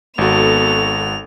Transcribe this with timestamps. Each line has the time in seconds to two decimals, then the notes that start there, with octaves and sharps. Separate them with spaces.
0.18 G#1 B3 F#4 A4 F7